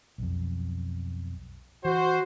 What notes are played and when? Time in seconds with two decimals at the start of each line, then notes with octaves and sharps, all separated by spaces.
0.18 B1 F2
1.85 E3 F#4 C5